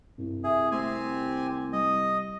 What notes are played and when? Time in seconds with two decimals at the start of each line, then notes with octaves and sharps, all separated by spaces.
0.18 C2 G2
0.44 G#4 E5
0.72 A3 C4 G4 G#5
1.73 G3 D#5